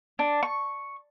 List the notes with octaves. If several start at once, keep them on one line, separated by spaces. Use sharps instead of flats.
D4
C#6